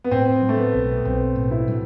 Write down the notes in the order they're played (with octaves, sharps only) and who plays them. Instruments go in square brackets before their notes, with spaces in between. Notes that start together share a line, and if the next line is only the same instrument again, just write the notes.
[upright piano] B3
[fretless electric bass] A2 [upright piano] C4
[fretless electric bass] F#3
[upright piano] A3
B3
[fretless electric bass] B1
[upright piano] B3
[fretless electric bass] B1 [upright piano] C4
[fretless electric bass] A2
[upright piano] E4
[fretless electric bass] F#3